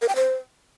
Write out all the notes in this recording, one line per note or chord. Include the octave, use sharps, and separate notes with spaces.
A#4
G5
C5